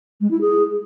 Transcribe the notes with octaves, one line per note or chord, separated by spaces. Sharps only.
G#3
E4
G#4